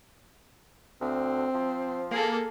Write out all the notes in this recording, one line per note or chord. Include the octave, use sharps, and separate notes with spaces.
D2 C4
F3
A#3 G#4 A4